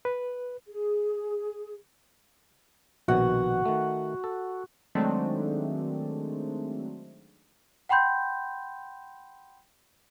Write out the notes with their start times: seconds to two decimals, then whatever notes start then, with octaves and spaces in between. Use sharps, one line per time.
0.05 B4
0.68 G#4
3.08 A#1 B2 D#3 F#4 F#5
3.65 D#3 A3
4.24 A4
4.95 D#3 F#3 G#3 A3 C4 D4
7.89 F#5 G5 B5 C6 G6